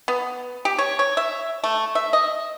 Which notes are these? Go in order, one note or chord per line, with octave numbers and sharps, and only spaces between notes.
B3
G4
C#5
C#5
E5
A3
E5
D#5